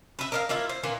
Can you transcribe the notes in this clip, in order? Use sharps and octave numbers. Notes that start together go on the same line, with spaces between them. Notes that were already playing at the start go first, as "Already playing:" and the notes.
B4 E5
A#4 D#5 F5
A#3 E4 F4 E5
C5
A#2 E3 A#3